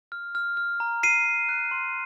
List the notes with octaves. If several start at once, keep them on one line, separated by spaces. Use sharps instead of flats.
F6
F6
F6
A#5
A#5 C7 D#7
A#5
F#6
C6